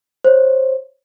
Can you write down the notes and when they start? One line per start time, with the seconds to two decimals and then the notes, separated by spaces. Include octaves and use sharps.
0.24 C5 C#5